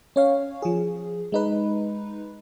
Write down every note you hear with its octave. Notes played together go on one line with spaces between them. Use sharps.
C#4 C#5 F5
F3 G#4
G#3 D#4 B4